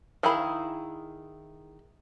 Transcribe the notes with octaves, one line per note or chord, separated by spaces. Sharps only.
D#3 E4 G#4 F5 B5